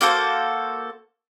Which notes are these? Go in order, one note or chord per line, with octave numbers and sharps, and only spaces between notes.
A#3 F#4 A4 C5